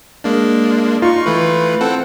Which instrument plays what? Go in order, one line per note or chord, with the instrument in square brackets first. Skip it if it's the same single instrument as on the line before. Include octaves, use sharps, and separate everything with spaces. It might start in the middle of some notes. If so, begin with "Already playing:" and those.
[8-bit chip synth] G#3 A#3 D4
[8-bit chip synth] D#4 C#6 [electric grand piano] F4
[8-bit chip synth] E3 A3 B4
C4 A4 F#5